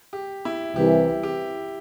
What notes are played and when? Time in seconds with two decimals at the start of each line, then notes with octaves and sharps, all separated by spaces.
0.13 G4
0.45 E4
0.76 C2 C3 E3 G4
1.23 G4